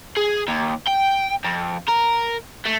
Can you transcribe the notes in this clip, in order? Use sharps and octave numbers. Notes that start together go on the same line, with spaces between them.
G#4
D#2
G5
F2
A#4
A3